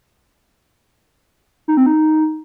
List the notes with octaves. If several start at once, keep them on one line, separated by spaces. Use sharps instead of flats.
D#4
C4
D#4